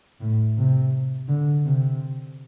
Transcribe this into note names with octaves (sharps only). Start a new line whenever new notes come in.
A2
C3
D3
C3